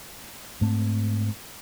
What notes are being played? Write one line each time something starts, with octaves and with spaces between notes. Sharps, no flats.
G#2 A3 C4